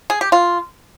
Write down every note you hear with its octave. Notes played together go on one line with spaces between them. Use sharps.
G#4
G4
F4